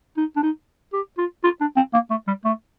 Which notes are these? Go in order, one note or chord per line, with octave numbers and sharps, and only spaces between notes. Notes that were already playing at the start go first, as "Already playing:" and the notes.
D#4
D4
D#4
G4
F4
F4
D4
C4
A#3
A3
G3
A3